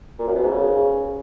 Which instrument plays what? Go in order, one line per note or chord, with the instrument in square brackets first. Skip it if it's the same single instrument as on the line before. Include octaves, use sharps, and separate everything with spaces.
[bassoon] A#2
F#2
B2
G#2
C#3